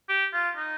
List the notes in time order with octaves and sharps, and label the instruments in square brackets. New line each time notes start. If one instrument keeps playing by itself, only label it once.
[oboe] G4
F4
D#4